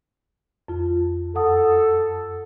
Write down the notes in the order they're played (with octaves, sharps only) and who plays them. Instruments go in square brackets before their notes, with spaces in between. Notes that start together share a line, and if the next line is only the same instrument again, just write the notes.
[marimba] F2 F4
[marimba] F#2 F#5 D#6 [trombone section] A4